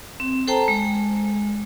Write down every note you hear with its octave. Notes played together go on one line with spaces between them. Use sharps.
C4
A4 C5 G5 A5 A#5
G#3